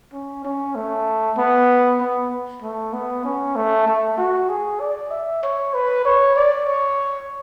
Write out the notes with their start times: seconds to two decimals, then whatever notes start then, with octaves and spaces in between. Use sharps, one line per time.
0.13 C#4
0.45 C#4
0.75 A3
1.38 B3
2.00 B3
2.62 A3
2.93 B3
3.25 C#4
3.56 A3
3.88 A3
4.18 F#4
4.49 G#4
4.80 D5
5.11 E5
5.43 C#5
5.74 B4
6.05 C#5
6.36 D5
6.67 C#5